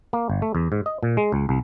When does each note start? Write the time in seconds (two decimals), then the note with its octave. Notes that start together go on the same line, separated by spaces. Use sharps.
0.13 A#3
0.30 G1
0.42 A3
0.55 E2
0.72 G#2
0.86 D#5
1.03 A#2
1.17 G#3
1.32 C#2
1.49 C2